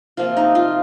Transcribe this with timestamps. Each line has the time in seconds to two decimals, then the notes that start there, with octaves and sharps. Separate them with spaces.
0.17 C3 F3 A#3 F4
0.37 D#4
0.55 F4